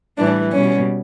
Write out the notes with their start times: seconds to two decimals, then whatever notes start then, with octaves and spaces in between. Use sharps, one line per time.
0.18 A2 E3 G3 D4
0.52 B2 G3 C#4